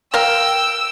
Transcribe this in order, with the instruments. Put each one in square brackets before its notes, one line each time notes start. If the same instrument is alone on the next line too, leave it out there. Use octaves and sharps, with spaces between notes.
[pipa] A#4 F5 [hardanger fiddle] G5 [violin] E6